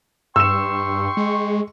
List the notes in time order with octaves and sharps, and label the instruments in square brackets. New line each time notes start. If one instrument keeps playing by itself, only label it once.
[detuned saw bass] G2 [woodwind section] G5 C6 C#6 [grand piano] E6 E7
[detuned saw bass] G#3